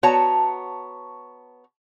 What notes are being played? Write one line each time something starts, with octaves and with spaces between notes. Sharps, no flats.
B3 F#4 C#5 A5 A#5